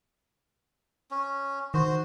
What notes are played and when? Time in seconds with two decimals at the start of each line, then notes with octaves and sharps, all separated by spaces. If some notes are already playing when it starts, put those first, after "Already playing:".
1.11 C#4
1.74 D#3 F#4 C5